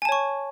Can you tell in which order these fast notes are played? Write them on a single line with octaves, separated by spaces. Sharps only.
G#5 A5 C#5 C#6